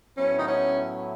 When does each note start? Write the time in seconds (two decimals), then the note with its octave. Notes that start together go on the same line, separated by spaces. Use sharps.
0.17 A2 F#3 B3 C#4 E4
0.39 D#4
0.47 C#4